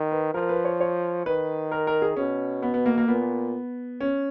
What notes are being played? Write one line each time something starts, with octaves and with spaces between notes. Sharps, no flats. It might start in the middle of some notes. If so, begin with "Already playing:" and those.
Already playing: D#3
B4
F3 A#4
B4
C#5
C#5
D#3 B4
A#4
A#4
G#4
B2 C#4
B3
B3
A#3
A#3
A#2 B3
C#4